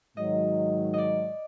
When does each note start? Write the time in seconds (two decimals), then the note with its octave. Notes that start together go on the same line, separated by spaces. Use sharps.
0.17 G#2 D#3 F#3 D#5
0.94 D5 D#5